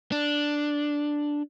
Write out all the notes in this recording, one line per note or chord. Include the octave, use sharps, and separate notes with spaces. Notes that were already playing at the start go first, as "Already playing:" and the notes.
D4